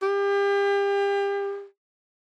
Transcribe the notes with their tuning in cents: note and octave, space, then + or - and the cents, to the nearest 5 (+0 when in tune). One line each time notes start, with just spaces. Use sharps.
G4 +35